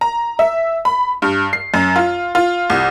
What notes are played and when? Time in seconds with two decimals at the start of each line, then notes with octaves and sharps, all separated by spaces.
0.01 A#5
0.39 E5
0.85 B5
1.22 G2
1.53 C7
1.74 F#2
1.96 F4
2.35 F4
2.70 C2